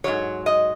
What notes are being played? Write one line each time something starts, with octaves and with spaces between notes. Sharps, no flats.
G#2 D#3 F#3 C#5
D#5